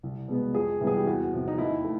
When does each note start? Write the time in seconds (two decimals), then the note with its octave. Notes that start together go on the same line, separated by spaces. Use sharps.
0.03 C2
0.28 B2 G#3 B3
0.54 F2 G#4
0.80 C3 E3 G3 B3
0.87 G#4
0.97 G4
1.07 E2 F#4
1.33 C3 F3
1.48 D#4
1.58 D#2 E4
1.85 A3